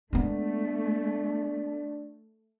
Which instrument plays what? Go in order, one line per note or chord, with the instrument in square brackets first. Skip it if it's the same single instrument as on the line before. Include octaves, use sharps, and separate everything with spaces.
[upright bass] G#3 B3 [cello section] A3 [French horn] D4